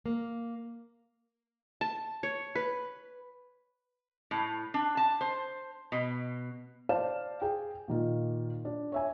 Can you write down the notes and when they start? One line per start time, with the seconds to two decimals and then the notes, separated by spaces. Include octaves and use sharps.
0.06 A#3
1.81 A5
2.23 C#5
2.55 B4
4.31 A2
4.74 D4
4.97 A5
5.21 C5
5.92 B2
6.89 C5 D5 F5 A5 E7
7.42 G#4 G5
7.88 A#2 D#3 F4
8.65 D4
8.92 C#5 E5 G#5